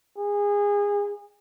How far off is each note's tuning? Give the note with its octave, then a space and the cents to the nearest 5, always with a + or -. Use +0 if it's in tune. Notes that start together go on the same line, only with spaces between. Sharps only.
G#4 -25